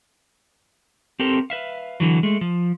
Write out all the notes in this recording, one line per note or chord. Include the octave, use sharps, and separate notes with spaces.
C4 G4 A4 A#4 C5
B4 E5 F5
D3 E3 F#3
G#3 A3
F3